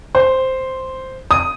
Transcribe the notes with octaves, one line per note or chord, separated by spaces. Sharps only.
C5
D#6